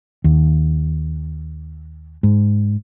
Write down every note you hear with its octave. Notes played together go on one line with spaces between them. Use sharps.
D#2
G#2